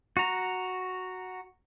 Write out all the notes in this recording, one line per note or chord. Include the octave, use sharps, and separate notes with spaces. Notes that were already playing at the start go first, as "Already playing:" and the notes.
F#4 A#5